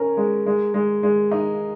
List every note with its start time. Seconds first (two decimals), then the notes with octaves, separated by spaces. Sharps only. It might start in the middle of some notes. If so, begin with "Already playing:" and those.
Already playing: C#4 A#4
0.17 G#3
0.46 G#3
0.74 G#3
1.03 G#3
1.31 D#4